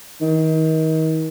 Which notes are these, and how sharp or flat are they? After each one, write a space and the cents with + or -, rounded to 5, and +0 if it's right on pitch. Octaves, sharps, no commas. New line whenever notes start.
D#3 +35